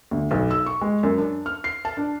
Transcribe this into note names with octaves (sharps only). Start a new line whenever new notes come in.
D2
B1
E6
C#6
G#3
F#2
D4
F6
C7
A5
D4